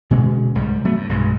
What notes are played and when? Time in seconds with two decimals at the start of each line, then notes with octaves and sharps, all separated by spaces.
0.11 B2 D3 G#3 C#4
0.55 C2 G#2 G3
0.85 F#3 A3 B3
0.97 G2
1.09 B1 G2 D#3 G#3